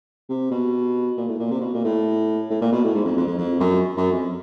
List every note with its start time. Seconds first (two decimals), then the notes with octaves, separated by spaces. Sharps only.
0.29 C3
0.51 B2
1.17 A#2
1.28 A2
1.39 A#2
1.51 C3
1.61 B2
1.74 A#2
1.84 A2
2.50 A2
2.61 A#2
2.72 B2
2.84 A2
2.94 G#2
3.05 F2
3.17 F2
3.27 F2
3.38 F2
3.60 F#2
3.97 F#2
4.12 F2